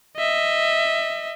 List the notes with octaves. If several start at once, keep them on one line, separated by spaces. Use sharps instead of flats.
D#5 E5